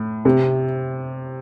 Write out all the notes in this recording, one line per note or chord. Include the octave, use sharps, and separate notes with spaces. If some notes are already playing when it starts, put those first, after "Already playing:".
Already playing: A2
C3